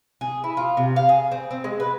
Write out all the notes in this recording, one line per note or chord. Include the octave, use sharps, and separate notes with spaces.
G#4
E4
F4
C3
F5
G#4
C4
C4
G#3
B4